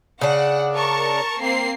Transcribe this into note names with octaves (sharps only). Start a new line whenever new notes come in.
C#3 D4 F#5
A#4 A5 C#6
A#3 C4 C7